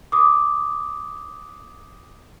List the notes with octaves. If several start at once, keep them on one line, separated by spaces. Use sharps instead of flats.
D6 D#6